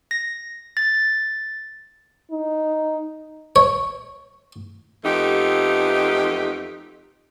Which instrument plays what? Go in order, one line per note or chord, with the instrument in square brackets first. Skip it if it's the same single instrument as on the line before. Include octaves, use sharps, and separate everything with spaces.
[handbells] A#6
A6
[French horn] D#4
[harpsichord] C#5
[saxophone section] F2 A3 B3 D#4 G4